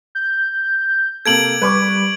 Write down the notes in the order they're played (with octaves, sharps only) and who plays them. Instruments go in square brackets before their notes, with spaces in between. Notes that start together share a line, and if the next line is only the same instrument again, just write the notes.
[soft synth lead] G6
[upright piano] C3 A#3 A4 [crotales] G#6 D7 F#7
[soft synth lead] G3 [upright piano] B4 C#6 D6